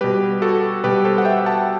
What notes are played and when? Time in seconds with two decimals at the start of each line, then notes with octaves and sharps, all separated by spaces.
0.01 B2 G3 G4 B4
0.42 F#4 A4
0.84 B2 G3 G4 B4
1.05 A4 C5
1.18 F#5
1.25 E5 G5
1.46 F#5 A5